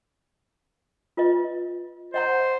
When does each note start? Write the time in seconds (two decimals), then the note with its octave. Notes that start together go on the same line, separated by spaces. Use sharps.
1.17 F4 B4 D#5
2.14 C5 D#5 F#5 A#5